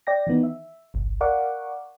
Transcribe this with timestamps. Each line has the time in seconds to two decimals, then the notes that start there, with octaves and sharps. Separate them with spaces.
0.07 D5 G5 A#6
0.27 D#3 E3 B3 D#4
0.43 E5
0.94 G1 C2
1.21 A#4 D5 F5 F#5 C#6 D6